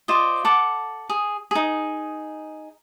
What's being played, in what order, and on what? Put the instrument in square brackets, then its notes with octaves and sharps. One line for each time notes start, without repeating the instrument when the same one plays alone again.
[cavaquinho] F4 C5 D5 D#5
A4 F#5 D6
G#4
D#4 G#4